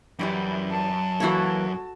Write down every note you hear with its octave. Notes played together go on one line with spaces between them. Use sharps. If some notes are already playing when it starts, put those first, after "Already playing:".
F#2 E3 G3 E4
A5
E3 A#3 F#4 A4 C#5